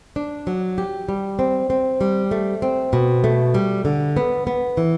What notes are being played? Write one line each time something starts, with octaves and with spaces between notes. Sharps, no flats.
D4
F#3
G4
G3
C4
C4
G3
A3
C4
B2
A3
G3
D3
B3
B3
E3